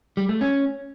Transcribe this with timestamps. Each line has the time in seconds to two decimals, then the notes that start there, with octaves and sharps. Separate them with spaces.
0.17 G3
0.29 A3
0.41 C#4